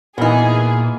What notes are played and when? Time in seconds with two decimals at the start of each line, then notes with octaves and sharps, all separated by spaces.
0.18 A#2 E3 A#3 B3 D#4 G#4